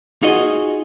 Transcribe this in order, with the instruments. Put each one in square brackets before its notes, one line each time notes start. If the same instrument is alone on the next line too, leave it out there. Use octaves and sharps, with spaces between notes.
[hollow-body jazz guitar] D#4 F4 F#4 G#4 D#5